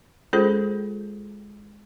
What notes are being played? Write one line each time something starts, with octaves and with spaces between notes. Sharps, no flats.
G#3 C#4 F4 G#4 A4 C5